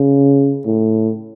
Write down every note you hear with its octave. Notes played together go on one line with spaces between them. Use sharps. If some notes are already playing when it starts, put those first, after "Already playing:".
Already playing: C#3
A2